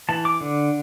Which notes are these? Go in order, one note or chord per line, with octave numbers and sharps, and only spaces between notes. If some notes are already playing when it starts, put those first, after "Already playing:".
E3 A5
D6
D3